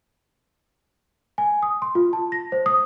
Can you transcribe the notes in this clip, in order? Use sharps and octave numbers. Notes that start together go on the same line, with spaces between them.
G#5
D#6
C6
F4
A5
A#6
C5
D#6